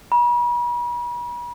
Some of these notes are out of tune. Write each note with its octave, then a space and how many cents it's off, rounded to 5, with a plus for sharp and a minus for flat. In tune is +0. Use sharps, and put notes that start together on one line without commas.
B5 -45